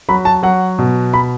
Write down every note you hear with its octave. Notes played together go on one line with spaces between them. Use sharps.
F#3 B5
A5
F#3 F#5
B2
B5